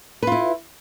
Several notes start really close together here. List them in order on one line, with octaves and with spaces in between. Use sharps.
B4 F4 E4